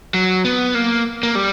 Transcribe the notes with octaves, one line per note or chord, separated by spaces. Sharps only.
F#3
B3
A#3
A#3
G3